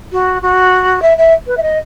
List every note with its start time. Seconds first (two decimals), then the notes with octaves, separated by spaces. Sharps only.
0.13 F#4
0.42 F#4
1.02 E5
1.18 E5
1.47 B4
1.57 E5
1.63 D#5